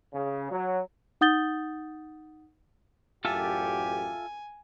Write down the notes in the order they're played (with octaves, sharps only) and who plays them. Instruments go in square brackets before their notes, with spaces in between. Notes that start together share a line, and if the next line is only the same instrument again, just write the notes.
[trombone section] C#3
F#3
[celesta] D#4 F#5 D#6 G6 A6 G7
[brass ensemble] A1 F#2 G4 [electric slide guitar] F4 A4 E5 [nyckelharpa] G#5